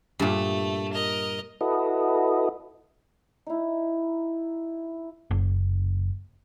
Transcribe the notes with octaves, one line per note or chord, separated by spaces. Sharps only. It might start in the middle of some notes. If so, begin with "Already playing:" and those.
G2 A#2 A3
A#4 D#5
E4 F#4 A4 B4 D#5
D#4 E4
F#1